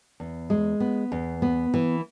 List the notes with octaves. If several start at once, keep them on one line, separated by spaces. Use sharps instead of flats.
E2
G#3
B3
E2
B3
E3